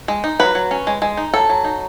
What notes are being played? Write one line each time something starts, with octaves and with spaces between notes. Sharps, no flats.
G#3
D#4
F#3 B4
F#3
C#4
G#3
G#3
D#4
F#3 A4
F#3
D#4